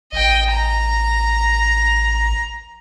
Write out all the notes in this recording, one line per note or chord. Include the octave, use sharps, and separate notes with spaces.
A1 D#5 G5
A#5